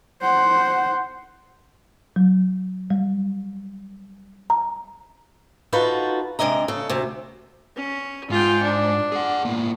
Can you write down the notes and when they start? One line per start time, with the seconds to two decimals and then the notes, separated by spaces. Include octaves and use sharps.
0.22 C5 F#5
2.16 F#3
2.90 G3
4.50 A#5
5.73 D#4 F4 F#4 A4 B4
6.39 C3 G#3 D4 D#5 A#5
6.68 C#3 A4
6.89 D2 C3
7.76 C#4
8.30 G#2 F4 G5
8.63 D4
9.12 G#4 F#5
9.45 A2 A#3